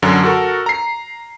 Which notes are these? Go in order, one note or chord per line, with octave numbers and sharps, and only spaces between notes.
F#2 D3 F#3
F#4 A4 A#4
A#5 C7